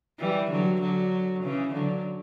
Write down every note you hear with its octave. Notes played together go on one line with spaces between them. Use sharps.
E3 G3
D3 F#3
D3 F#3
C#3 E3
D3 F#3